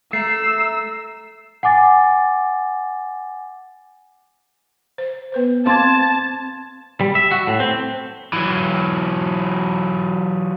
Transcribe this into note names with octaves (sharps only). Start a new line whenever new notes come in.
A3 A#5 E6 C7
F#5 G#5 D6 A6
C5
B3 B4 C5
C4 F5 A5 C6 D6 G#6
G3
E5
F#4
A2
C4
E3 F#3